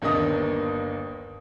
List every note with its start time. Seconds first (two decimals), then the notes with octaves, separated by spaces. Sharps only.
0.02 G1 D#2 A#3 D4 D#5 D#6